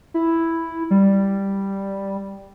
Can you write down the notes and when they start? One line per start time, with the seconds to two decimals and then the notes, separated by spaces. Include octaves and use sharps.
0.14 E4
0.91 G3